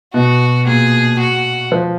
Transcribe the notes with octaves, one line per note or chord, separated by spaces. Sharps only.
B2 F#4
A#2 G#4
F#4
F3